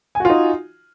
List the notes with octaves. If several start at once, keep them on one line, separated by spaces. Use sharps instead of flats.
D#4 F4 F#4 G#5